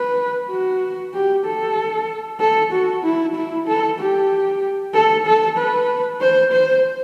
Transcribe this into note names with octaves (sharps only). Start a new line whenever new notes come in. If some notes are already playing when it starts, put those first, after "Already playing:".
Already playing: B4
F#4
G4
A4
A4
F#4
E4
E4
A4
G4
A4
A4
B4
C5
C5